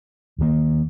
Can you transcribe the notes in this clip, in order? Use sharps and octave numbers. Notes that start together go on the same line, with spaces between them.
D#2 D#3 A#3